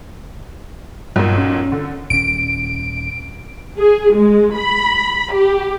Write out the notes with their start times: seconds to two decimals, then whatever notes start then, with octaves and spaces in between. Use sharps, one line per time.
1.16 B1 G2 A#2
1.38 C#4
1.72 D3
2.10 D#1 C#4 D7
3.78 G#4
4.15 G#3
4.56 B5
5.34 G4